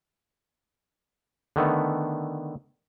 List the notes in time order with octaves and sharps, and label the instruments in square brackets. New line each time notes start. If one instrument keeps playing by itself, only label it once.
[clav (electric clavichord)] D3 D#3 A3 B3